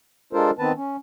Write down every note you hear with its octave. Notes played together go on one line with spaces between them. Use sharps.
G#3 D4 F4 A4 A#4 C5
D#3 B3 C4 B4 A5
C#4